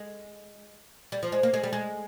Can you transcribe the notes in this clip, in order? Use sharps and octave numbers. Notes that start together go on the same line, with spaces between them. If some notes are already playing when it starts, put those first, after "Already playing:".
Already playing: G#3
G3
F3
G#3
A#3
G#3
G3
G#3